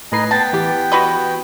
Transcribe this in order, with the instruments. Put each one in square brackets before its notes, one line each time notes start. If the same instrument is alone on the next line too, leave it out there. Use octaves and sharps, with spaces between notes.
[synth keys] A2 B4 C7 [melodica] D#4 D#5 G#5
[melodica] B3 G5 [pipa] A5
[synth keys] E3 G4
[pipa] F#4 B4 D#5